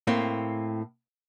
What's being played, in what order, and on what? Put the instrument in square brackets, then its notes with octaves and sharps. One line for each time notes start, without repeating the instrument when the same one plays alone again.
[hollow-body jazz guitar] A2 A#3 C4